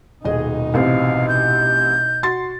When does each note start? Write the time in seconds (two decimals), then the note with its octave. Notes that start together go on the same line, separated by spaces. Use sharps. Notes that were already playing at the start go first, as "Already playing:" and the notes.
0.24 D#1 B2 D#4 G#4 D#5
0.74 A1 C3 C4 F5
1.28 G6
2.23 F#4 C6 A6